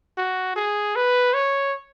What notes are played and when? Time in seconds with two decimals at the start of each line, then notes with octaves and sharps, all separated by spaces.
0.18 F#4
0.56 G#4
0.96 B4
1.34 C#5